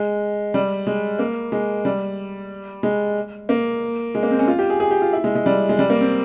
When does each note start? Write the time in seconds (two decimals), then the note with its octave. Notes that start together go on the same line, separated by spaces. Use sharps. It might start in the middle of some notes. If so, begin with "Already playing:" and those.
Already playing: G#3
0.54 G3
0.87 G#3
1.19 A#3
1.52 G#3
1.85 G3
2.83 G#3
3.49 A#3
4.15 G#3
4.23 A#3
4.31 C4
4.39 C#4
4.48 F4
4.59 G4
4.70 G#4
4.80 G#4
4.91 G4
5.02 F4
5.13 E4
5.24 G#3
5.35 G#3
5.46 G3
5.69 G#3
5.79 G3
5.90 A#3
6.01 C4